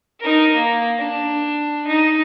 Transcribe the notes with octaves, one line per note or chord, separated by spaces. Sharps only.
D#4 A#4
A#3
D4
D#4